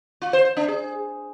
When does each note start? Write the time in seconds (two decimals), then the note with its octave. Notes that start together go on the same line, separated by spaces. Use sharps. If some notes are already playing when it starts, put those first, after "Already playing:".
0.22 F4
0.33 C5
0.45 C5
0.57 D4
0.68 G#4